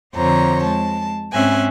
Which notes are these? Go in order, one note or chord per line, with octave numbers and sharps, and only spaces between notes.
F2 D3 C5 C#5 A#5
G#3 A5
G#2 C4 C#4 E5 G#5 F#6